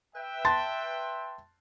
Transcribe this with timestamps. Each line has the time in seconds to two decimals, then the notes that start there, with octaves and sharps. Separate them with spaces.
0.15 B4 E5 G5
0.45 A5 C6 A6